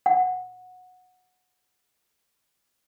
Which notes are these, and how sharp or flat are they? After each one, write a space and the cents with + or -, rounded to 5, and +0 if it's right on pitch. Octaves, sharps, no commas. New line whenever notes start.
F#5 -15